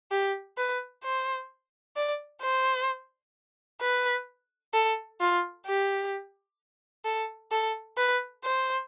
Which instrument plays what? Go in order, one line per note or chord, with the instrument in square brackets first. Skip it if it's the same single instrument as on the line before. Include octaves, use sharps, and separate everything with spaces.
[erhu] G4
B4
C5
D5
C5
B4
A4
F4
G4
A4
A4
B4
C5